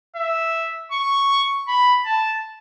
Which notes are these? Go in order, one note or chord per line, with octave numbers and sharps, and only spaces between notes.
E5
C#6
B5
A5